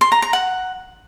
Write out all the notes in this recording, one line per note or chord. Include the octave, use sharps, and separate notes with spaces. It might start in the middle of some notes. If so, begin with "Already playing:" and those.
C6
A#5
A#5
F#5